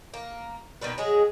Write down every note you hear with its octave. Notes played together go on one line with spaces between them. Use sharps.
A#3
B2 D#3 G3 B4
F#3 G#3 G#4